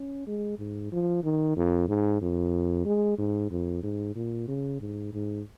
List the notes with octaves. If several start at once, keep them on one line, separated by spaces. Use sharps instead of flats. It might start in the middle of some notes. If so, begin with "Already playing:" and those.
Already playing: C#4
G#3
G#2
F3
D#3
F2
G#2
F2
G#3
G#2
F2
G#2
A#2
C#3
G#2
G#2